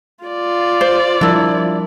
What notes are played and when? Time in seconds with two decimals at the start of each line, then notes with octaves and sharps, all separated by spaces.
0.25 F4 D5
0.81 C5
1.21 F3 G3 D4 E4 A#4